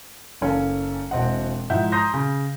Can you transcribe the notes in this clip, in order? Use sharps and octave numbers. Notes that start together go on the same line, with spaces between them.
F#1 C#4 A4 F5
E1 C4 D#5 F#5
G#2 F3 E4 E5 F#5 G6
A#5 C6 D#6 G6 A#6
C#3